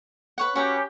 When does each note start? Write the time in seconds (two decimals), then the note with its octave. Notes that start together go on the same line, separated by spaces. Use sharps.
0.38 B4 C#5 F#5
0.55 C#4 F#4 G4 B4 A#5